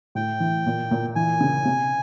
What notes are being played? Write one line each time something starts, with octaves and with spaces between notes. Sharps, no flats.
A2 G5
E3
A#2
A#2
E3 G#5
C#3
C3